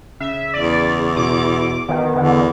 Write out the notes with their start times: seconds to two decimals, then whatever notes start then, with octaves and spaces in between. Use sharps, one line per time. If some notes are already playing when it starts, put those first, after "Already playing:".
0.20 C#3 E5
0.54 E2 D5
1.17 B2 D6
1.89 D#3 B3
2.16 E2 D3